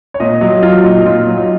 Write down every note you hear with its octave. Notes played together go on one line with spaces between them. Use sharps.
C#5
A#2 D#5
F#3 D#5
F#3 F4
A#2 D#4
A#2 F4
F#3
D#4